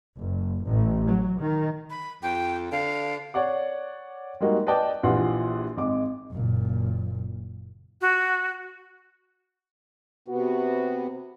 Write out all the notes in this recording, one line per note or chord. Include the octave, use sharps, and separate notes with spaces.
F#1
A1
F#3
D#3
B5
F2 G5
D3 F5
C#5 D5 F#5 D6
G3 G#3 A#3 D#4 F#4 A#4
B4 D5 D#5 G5 A5 D6
A#1 E3 F4 G4 F#5 C6
G#1 G#3 D6
F#1 A#2
F#4
C3 B3 F#4